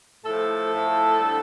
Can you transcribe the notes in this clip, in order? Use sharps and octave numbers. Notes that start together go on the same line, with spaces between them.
A2 F3 A3 A4
A2 F3 A3
D3 G3